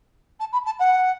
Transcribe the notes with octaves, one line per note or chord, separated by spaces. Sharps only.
A5
B5
A5
F#5